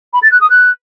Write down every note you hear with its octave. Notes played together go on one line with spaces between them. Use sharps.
B5
A6
F#6
D#6
F#6